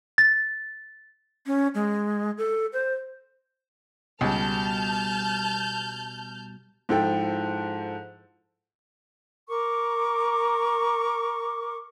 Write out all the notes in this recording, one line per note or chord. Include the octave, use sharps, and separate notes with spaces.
A6
C#4
G#3
A4
C5
C#2 B2 G3 A5 F6 G6
G#2 F3 E4 A4 G5
A#4 C#6 D6